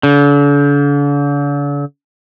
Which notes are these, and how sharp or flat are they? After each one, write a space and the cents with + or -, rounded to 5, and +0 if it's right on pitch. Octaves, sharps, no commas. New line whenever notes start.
D3 -40